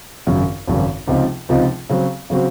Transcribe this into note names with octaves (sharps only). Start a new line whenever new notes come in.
G#1 F#2 C#3
G#1 F#2 C#3
C#2 C3 F3 C4 D#4
C#2 C3 F3 C4 D#4
C#3 F#3 C4 F#4
C#3 F#3 C4 F#4